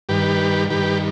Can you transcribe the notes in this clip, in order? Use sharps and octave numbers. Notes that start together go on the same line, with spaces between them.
G2 D#3 G4 B4
G2 D#3 G4 B4